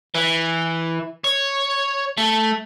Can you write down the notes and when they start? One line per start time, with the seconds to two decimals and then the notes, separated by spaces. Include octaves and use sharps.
0.15 E3
1.24 C#5
2.18 A3